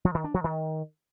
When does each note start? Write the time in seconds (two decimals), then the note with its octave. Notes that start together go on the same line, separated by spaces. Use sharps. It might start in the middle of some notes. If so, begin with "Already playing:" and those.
0.05 F3
0.14 D#3
0.24 D4
0.34 F3
0.44 D#3